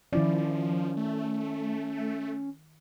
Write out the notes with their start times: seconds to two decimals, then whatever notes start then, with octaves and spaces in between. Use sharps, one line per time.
0.13 D#3 F3 C#4 E4 D5
0.97 A3